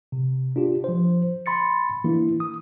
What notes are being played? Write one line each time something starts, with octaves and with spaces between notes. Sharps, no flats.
C3
D4 F4 G4
F3 C5
B5 C6 A6 C#7
E3 A#3 D4 E4
D#6